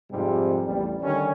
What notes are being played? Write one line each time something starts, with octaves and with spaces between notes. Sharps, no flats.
F2 G#2 C3 G3 G#3
A1 E2 G3
D3 D#3 G3 C#4